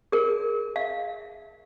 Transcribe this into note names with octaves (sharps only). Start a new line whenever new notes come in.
G#4 A#4
E5 F5